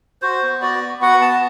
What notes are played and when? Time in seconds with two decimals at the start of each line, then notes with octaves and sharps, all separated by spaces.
0.22 F#4 C5
0.43 B3
0.62 F#4 D5
0.82 B3
1.01 F#4 F#5
1.21 B3 A5